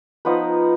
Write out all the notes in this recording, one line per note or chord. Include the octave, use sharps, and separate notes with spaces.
F3 B3 D#4 B4